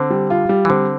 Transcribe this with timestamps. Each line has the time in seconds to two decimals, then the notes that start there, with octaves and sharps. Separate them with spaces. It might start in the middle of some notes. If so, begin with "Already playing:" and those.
Already playing: D3 C4
0.10 G3
0.30 F4
0.49 G3
0.65 E3
0.69 D3 C4